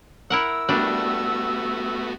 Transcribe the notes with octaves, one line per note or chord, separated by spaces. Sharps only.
E4 A#4 F#5 E6
G3 A3 B3 D4 F#4